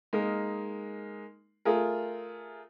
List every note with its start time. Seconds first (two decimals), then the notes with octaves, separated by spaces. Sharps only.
0.13 G#3 A#3 D#4 A#4
1.65 A3 F4 G#4 A#4